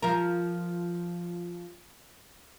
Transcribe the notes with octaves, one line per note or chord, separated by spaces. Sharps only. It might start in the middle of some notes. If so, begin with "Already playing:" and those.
F3 A#4